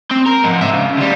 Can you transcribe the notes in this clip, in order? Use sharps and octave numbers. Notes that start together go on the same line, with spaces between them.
C4
A#4
G#2 F3
C5 E5
C#3
D2 G3